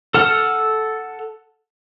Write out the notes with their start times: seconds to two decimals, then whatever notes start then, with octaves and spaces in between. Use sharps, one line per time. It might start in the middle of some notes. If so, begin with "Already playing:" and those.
0.14 A4 F#5 F6